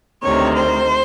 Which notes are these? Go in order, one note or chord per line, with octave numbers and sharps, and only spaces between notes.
D2 C3 D#3 C#5
C5